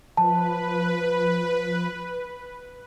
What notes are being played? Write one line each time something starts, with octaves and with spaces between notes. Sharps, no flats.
F3 B4 A5